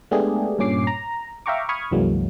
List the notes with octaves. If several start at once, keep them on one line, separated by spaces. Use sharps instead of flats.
G#3 A3 B3 D4 G4 G#4
G2 A#2 C#4 D6 C7
A#5
E5 F5 G5 A#5 C#6 D6
B5 C#6 D#6 F6 G#6
C2 F#2 E3 F#3 G#3 A#3